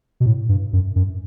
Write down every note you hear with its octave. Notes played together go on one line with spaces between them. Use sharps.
B2
A2
G2
F#2
F#2